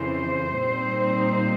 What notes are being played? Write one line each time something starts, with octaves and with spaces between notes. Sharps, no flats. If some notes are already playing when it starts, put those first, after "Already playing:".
Already playing: F2 C#3 E3 C5
A#2 G3 C4 D#4